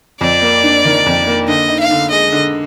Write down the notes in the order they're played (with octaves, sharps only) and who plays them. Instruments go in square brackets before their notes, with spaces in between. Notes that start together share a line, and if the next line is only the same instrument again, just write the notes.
[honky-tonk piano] F2 [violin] D5
[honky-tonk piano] A#3
D4
D#3
F2
A#3
[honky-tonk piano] D3 [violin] D#5
[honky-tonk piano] D#4
[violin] F5
[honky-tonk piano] D3
[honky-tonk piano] G#3 [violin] D#5
[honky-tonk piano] D3